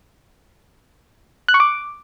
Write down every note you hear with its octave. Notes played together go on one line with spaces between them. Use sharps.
F#6
C#6
D6